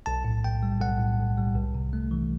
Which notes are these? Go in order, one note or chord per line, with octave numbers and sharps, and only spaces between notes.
B1 A5
A2
B1 G5
G3
B1 F#5
A2
B1
G3
C2
C3
A3
E3